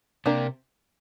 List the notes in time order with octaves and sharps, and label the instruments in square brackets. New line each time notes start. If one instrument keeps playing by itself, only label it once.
[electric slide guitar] C3 [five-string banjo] A#3 D4 G4 A#4